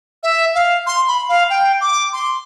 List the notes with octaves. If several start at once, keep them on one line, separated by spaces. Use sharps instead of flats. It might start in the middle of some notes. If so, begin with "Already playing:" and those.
E5
F5
C6
B5
F5
G5
D6
C6